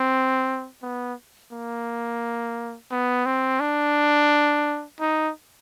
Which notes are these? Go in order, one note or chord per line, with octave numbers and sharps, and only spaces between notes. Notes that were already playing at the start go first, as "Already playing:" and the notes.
Already playing: C4
B3
A#3
B3
C4
D4
D#4